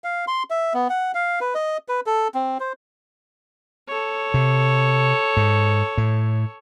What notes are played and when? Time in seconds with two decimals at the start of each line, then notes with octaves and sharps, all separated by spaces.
0.04 F5
0.28 C6
0.50 E5
0.74 B3
0.90 F#5
1.15 F5
1.41 B4
1.55 D#5
1.88 B4
2.06 A4
2.34 C4
2.60 C5
3.88 A4 C#5
4.34 C3
5.37 G#2
5.98 A2